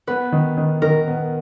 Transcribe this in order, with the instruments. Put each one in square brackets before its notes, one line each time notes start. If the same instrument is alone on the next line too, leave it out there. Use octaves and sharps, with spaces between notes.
[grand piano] B3 [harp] B4
[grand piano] D#3
D#3
[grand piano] D#3 [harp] A#4
[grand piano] B3